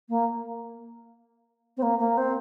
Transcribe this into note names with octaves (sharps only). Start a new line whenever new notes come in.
A#3
C4
A#3
A#3
C4